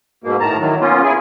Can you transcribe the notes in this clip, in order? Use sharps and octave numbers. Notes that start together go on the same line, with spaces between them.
G#2 B2 A#3
A2 D#3 A5 A#5
D#3 E3 F#3
A#3 B3 C#4 F4
E4 G#4 G#5